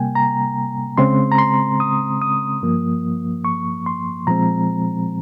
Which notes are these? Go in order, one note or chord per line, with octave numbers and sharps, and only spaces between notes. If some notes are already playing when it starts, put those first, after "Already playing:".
Already playing: C3 G3 A#3 G5 G#5
A#5
C#3 G#3 C4 C6
A#5
C6
D#6
D#6
G2 F3 A#3
C#6
C6
A#2 F3 G#3 C4 A#5